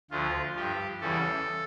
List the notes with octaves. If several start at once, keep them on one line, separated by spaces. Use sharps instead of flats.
D2 D3 F3 F4
G2 F3 G4
E2 C#3 E3 G3 A4